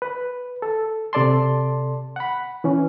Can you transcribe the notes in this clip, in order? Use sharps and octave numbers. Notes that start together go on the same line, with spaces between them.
B4
A4
C3 A4 D5 A5 C6
F#5 B5
E3 C#4